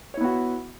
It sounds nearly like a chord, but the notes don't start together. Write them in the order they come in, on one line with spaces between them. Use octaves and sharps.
C#5 E4 B3 F#4